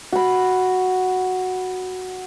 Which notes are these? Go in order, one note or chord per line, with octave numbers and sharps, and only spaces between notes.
F#4 B5